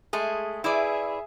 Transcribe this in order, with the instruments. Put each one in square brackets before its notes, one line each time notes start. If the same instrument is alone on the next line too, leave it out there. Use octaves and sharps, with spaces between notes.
[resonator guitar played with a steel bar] G#3 A3 G#4
[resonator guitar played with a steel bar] E4 B4 D5 [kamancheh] G#4 E5